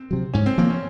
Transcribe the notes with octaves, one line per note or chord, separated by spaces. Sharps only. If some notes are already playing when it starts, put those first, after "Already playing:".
Already playing: C4
C3 F#3
G#2 C#4
C4
F3 A#3 C#4
C#4